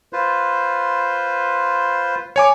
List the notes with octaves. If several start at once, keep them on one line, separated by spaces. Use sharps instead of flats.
F4 B4 C5
C#5 G#5 D6